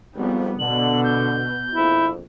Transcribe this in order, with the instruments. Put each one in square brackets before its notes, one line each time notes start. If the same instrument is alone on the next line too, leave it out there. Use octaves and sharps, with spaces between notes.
[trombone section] G#1 F2 [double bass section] G3 B3
[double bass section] B2 [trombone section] D3 [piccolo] F#7
[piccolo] G6
[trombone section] A#1 F2 [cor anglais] E4